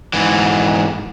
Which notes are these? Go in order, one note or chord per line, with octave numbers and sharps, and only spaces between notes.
G#2 E3